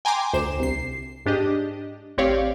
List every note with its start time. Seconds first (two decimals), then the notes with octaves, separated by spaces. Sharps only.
0.05 G5 G#5 A#5 C6 D6
0.33 D2 C5 E7
0.60 C2 C7
1.26 G#2 D4 G4 D#5
2.18 A1 C4 G4 C#5 D5 F5